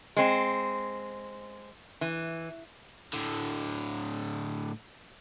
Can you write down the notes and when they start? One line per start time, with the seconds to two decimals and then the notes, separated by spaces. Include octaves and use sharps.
0.16 G#3 C4
2.01 E3
3.13 A2 D3